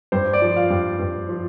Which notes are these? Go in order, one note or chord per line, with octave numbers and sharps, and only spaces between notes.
G2 C5
D5
F3
F5
G2
G2
F3